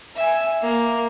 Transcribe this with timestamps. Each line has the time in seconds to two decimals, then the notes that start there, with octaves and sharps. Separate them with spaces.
0.16 E5 G#5
0.62 A#3